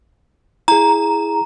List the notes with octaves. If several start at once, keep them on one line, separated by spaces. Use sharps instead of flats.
E4 G#4 A#5